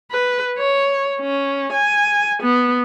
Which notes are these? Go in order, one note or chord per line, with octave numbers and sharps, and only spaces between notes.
B4
C#5
C#4
G#5
B3